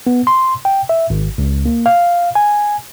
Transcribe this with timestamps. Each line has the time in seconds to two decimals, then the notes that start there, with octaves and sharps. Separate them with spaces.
0.07 B3
0.27 C6
0.65 G5
0.89 E5
1.10 G#1
1.38 C#2
1.66 A#3
1.86 F5
2.35 G#5